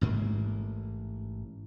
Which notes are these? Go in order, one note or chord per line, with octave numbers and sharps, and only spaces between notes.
A1 G#2 A#3